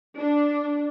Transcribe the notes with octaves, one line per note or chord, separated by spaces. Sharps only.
D4